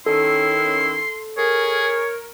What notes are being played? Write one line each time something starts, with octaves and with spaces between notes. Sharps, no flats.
D#3 C#4 E4 A4 C6
G#4 A#4 C#5